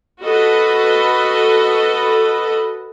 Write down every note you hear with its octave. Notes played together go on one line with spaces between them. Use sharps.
F#4 A4 B4 D#5